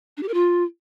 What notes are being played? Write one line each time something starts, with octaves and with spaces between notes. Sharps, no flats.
D4
G4
A#4
F4